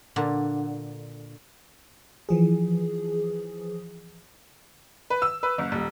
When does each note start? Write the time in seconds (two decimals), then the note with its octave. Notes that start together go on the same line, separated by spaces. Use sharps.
0.16 A#2 D3
2.29 E3 F3 G#4
5.10 B4
5.22 E6
5.43 B4
5.58 F#1
5.72 D#1